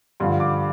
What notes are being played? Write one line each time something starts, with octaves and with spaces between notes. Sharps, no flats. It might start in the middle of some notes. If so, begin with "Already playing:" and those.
G2 D3 F3 C6
D6